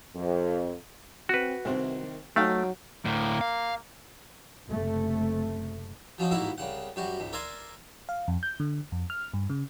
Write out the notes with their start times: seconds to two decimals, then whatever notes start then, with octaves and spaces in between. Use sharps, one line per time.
0.15 F2
1.29 C4 F#4 B4
1.65 C2 C3 D#3 C4
2.36 F#3 A3 D#4 F5 G5
3.05 D2 A2 A#3
3.41 F5
4.69 F#1 C3 A3
6.18 F3 F#3 C#4 D#4
6.31 A1 G#2 A#3 E4 F#4 E5
6.58 C2 C#3 F#5
6.96 F#2 G3 F#4
7.20 C#2 G#2
7.33 A#4 D5 E5 G#5 A#5 C6
8.09 F5
8.28 F2
8.43 G6
8.60 D3
8.92 F2
9.10 F6
9.33 G2
9.50 C#3